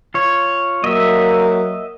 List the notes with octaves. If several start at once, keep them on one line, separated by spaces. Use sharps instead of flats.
F4 C#5
F#3 A#3 D#5 E5